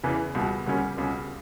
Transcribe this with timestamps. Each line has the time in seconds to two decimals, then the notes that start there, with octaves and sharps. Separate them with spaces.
0.04 E2 C#3 E3
0.35 C#2 B2 G3
0.66 D2 C#3 G3 A#3 C#4
0.97 C#2 B2 G3 C#4